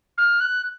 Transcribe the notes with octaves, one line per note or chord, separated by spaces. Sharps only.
F6
F#6